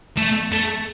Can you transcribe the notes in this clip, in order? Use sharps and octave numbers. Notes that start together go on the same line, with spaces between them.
A3
A3